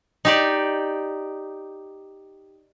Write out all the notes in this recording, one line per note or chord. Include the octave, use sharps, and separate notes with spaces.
D#4 G4 D5